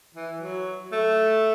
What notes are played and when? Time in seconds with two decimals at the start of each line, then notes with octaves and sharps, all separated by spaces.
0.14 E3
0.40 F#3
0.92 A3